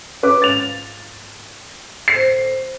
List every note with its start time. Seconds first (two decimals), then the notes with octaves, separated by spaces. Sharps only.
0.23 C#4 B4 D6
0.42 G#2 F4 F5 A6 F7
2.08 A2 D3 C5 C7